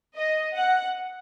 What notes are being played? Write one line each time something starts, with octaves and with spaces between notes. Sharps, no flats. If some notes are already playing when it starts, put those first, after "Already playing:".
D#5
F#5